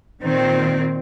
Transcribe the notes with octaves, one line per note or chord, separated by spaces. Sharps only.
A#2 D#3 C4